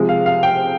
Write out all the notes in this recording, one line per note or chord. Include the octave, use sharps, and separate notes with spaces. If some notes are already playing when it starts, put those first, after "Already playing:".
Already playing: C3 F3 G#3
F5
F5
G5